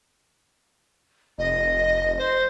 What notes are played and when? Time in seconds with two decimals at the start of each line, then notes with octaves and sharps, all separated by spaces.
1.38 F1 D#5
2.18 C5